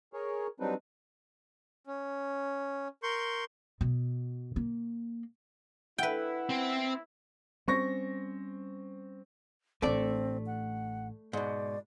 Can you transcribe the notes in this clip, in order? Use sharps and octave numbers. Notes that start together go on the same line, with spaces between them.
G#4 A#4 C#5
F#3 G3 C4 D4 D#4 B4
C#4
A#4 C6 C#6 G6
B2
A#3
E4 B4 F#5 G5
C4 C5
G3 C4 C#4 C#6 A#6
A1 A3 C4 D4 A4 D5
F#5
G#2 B2 D5